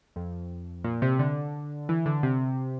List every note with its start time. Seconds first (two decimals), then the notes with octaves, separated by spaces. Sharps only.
0.16 F2
0.84 A#2
1.02 C3
1.19 D3
1.89 E3
2.06 D3
2.23 C3